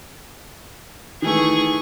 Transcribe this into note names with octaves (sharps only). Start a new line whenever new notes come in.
D#3 E3 A3 G#4 C#6